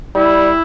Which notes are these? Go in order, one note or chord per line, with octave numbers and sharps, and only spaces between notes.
G3 E4